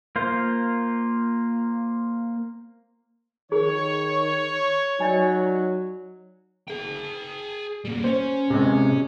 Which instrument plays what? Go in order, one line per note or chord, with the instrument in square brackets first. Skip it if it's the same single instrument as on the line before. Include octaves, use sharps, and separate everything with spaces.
[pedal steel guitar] A#3 F4 C5
[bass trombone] D#3 [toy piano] G#4 A#4 [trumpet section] C#5
[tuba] F#3 [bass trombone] D#4 [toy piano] D5 D#5 G#5
[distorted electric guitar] G#4 G5
G3 A#3
[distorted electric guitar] C#4 [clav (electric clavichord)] C5
[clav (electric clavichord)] C3 G#3